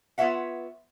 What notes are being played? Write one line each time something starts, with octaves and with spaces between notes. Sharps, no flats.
B3 F4 B4 C#5 E5 F#5